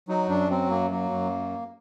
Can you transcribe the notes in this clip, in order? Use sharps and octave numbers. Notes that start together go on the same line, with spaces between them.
F#3 D#4
F#2 D4
F#3 C4
F#2 A#3
F#3 A#3
F#2